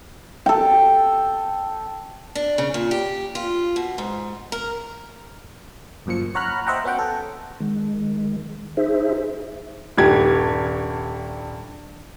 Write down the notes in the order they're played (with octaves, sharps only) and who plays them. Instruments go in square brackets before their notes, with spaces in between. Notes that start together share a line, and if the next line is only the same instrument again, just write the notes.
[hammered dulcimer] A4 G5
[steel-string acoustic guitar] D4
C#3
A#2
G4
F4
B2
G#2
A#4
[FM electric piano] G1 F#2 A#2 F3 C#7
C#5 F#5 A#5 B5 F6 F#6
C5 D#5 E5 F#5 G5 A#5
B3 C#4 F#4 F#5 G5
A4
[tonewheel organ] D#3 G#3
D#4 G#4 C5 E5
[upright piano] D#1 G2 G4 G#6